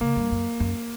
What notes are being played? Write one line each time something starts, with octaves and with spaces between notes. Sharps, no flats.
C#3 A#3
G2
F#2
F#2